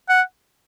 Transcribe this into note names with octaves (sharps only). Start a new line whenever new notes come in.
F#5